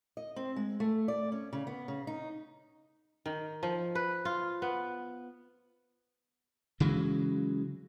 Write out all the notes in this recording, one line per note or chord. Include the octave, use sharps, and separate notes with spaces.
D#5
C4
G#3
A3
D5
C#4
C#3
B3
C#3
D#4
D#3
F3
B4
F4
B3
C#3 E3 F#3 G#3